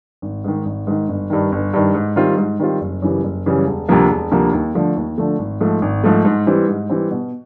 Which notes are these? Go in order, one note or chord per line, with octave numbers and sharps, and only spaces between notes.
G#1
G#2 D#3
G#1
G#2 D#3
G1
G2 D#3
G1
G2 D#3
G#2
D#3 G3 C4 F4
G#2
D#3 G3 C4 F4
F#1
F#2 C#3 E3 G3
F#1
F#2 C#3 E3 G3
E1
D2 C3 F3 A#3
E1
D2 C3 F3 A#3
D#2
D3 F3 A3
D#2
D3 F3 A3
G#1
G#2 F3 A3
G#1
G#2 F3 A3
G#2
E3 G3 C4
G#2
E3 G3 C4
B2